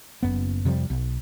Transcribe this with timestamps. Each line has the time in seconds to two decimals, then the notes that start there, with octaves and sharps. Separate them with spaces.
0.23 F#1 F#2 B3
0.65 F2 C3 F3 G3
0.90 B1